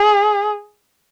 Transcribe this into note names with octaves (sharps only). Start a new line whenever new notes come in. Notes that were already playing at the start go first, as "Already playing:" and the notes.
Already playing: G#4